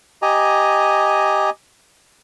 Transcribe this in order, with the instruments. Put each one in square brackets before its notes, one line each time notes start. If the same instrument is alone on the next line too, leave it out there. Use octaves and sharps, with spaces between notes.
[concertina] G4 D#5 G#5 A#5